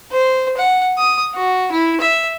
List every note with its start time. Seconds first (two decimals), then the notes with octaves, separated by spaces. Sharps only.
0.12 C5
0.58 F#5
0.98 D#6
1.35 F#4
1.72 E4
2.01 E5